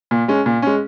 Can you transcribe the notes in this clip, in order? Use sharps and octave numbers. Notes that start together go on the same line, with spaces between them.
A#2
G#3 C#4
A#2
G#3 C#4